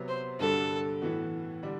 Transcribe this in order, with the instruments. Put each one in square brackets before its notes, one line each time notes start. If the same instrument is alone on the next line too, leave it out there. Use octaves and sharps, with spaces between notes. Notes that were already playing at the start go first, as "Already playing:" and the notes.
Already playing: [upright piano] C3 F#3 B3
[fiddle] C5
[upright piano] G2 D3 G3 D4 F#4 [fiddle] A4
[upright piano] A2 E3 B3 F#4
D3 G3 D4